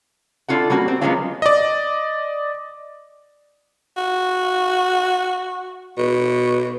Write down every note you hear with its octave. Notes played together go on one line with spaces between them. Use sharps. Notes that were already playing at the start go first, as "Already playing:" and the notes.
D4 E4 F4 A4 F#5
G3 A#3 C#4 F#4
C4
F#3 G#3 A#3 B3 C#4 F4
D5 D#5
F#4
B2